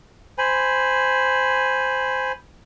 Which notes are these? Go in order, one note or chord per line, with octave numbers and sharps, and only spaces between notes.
C5 G#5 B5